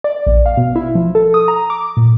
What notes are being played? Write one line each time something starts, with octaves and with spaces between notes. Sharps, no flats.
D5
A#1
F5
B2
E4
F3
A4
D#6
A#5
D6
A#2